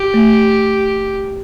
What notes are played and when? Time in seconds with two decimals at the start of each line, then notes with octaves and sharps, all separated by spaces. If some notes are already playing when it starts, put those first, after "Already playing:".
Already playing: G4
0.14 A3